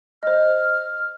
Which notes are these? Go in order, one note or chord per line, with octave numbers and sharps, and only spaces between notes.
C5 D#5 F6